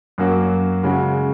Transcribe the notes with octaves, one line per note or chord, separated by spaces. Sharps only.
F#2 F#3 A#3 F#4
C#3 G#3 F#4